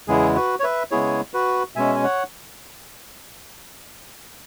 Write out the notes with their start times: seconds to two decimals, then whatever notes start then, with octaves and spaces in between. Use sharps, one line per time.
0.08 E2 C#3 G#3 B3 E4 G#4
0.35 F#4 B4
0.60 C#5
0.64 B4 E5
0.91 C#3 G#3 B3 E4 G#4 C#5
1.34 F#4 B4
1.76 B2 G#3 C#4 E5 G#5
1.95 G#5
2.03 C#5 F#5